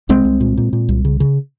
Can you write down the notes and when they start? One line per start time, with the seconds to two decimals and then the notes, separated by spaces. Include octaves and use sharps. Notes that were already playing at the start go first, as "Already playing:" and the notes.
0.09 C2 G#3 C4
0.25 C2
0.40 A#2
0.58 A#2
0.73 A#2
0.89 C2
1.05 C#3
1.20 C#3